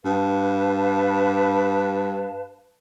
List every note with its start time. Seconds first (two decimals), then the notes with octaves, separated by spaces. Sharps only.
0.05 G2 B4 F5 A5